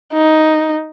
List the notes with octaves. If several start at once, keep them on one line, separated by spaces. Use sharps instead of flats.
D#4